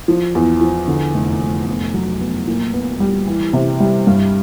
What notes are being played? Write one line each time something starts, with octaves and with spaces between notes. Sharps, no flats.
F3
E2
F3
D3
F1
F1
B3
F#3
B3
A#2
B3
G3
E3
C3
G3
G2